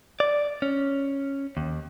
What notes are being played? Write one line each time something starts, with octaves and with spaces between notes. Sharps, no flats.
D5
C#4
D#2